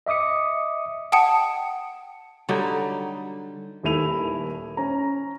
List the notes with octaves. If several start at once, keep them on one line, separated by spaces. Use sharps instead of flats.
D#5 E5 D6 D#6 C#7
F#5 G5 A5 D#6 C#7
D3 F#3 G3 D#4
D#1 D#2 A3 E4 D#7 F7
C#4 A#5